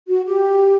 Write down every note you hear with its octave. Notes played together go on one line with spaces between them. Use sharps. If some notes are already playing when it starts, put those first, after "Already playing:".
F#4
G4